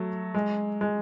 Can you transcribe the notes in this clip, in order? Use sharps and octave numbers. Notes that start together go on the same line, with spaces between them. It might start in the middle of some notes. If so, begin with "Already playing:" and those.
Already playing: F#3 A3
G#3
G#3